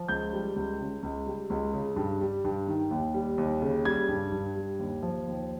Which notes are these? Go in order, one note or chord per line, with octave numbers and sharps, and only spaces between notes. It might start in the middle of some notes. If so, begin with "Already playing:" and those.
Already playing: F3
C#2 G6
G3
C#2
C#3
C#2
G3
C#2
C#3
G2
G3
G2
D#3
D#2
G3
D#2
C#3
G3 G#6
G2
G2
G3
D#2
F3
D#2